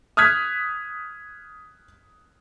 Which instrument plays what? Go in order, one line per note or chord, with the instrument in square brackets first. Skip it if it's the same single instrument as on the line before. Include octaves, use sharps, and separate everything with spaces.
[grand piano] D#6 F6 F#6 G#6 B6